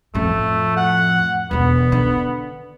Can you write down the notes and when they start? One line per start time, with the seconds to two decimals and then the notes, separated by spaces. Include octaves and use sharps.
0.15 F2 A2 A3
0.77 F#5
1.51 E1 D3 B3
1.92 D3